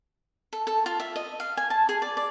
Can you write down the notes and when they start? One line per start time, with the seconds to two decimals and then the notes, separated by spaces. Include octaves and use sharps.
0.53 A4
0.67 A4
0.86 F4
1.00 E5
1.16 D#5
1.40 F5
1.57 G#5
1.70 A5
1.89 G#4
2.02 D5
2.17 D5